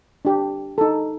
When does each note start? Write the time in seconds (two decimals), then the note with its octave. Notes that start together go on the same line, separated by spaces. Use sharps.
0.25 D4 G4
0.78 D#4 A4